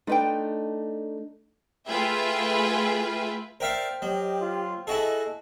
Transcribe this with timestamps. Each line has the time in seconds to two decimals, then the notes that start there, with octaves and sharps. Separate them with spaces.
0.07 A3 D4 D#4 F4 B4 G5
1.86 A3 F4 G#4 B4 E5 G5
3.60 A#4 C5 D5 E5 F5 G5 F6
4.02 F#3 G4 D#5
4.41 F4
4.87 E4 F#4 G#4 A4 D#5